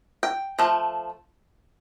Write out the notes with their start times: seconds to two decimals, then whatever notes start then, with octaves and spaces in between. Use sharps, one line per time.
0.23 G5
0.59 F3 A3